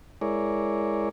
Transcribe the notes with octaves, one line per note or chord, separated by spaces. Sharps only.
G#3 E4 G#4 A#4 C#5 D5